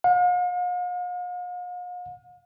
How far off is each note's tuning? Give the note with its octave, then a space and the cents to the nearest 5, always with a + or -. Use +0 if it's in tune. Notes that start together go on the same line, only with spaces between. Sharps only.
F5 +45